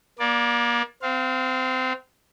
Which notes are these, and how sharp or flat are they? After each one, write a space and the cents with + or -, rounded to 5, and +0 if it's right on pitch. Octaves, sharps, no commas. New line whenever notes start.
A#3 +35 D5 +0
C4 -25 F5 +5